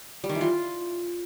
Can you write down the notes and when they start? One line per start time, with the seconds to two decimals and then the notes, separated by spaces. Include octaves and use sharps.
0.24 G3
0.29 D#3
0.35 E3
0.41 F4